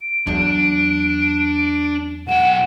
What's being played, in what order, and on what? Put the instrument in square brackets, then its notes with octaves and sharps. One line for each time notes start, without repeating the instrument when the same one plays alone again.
[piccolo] D7
[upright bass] E2 F#3 [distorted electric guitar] D4
[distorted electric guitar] B1 G5 [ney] F#5 [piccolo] E7